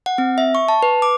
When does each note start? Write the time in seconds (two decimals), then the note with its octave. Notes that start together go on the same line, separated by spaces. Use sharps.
0.06 F#5
0.18 C4
0.38 E5
0.55 C#6
0.68 A5
0.83 B4
1.02 D6